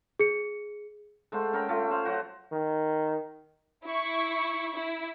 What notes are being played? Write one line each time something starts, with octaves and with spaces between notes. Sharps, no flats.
G#4 C#7
G#3 A3 C5 F#5
C#4 A#4 G5
A3 F4
C5 F5
F#3 F#4
D#3
E4 C#6
E4